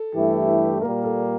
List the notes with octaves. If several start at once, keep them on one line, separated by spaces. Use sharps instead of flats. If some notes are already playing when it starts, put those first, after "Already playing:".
Already playing: A4
G2 E3 A3 E4 G4
A#2 G3 A#3 A#4
A4